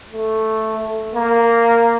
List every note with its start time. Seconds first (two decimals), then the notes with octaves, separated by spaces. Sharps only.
0.13 A3
1.15 A#3